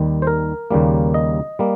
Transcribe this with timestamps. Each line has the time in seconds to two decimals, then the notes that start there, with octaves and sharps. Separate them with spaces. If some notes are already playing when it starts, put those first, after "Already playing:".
Already playing: D#2 D#3 G3
0.22 C5
0.27 A#4
0.71 D#2 C#3 G3 A#3
1.14 D#5
1.59 G3 A#3